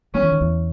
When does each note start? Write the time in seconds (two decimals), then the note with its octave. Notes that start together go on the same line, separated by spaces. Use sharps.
0.14 F#3 C#4
0.22 E3
0.32 D#3
0.41 E2 E3